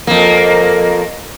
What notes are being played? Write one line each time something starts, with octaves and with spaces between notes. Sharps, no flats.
F2 A#3